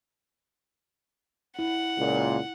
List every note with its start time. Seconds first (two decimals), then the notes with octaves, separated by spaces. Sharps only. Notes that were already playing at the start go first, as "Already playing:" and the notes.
1.59 E4 F#5
1.98 C#2 A#2